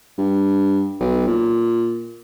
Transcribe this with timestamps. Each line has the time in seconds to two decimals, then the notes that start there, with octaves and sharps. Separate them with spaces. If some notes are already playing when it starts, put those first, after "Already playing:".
0.18 G2
1.00 B1
1.27 A#2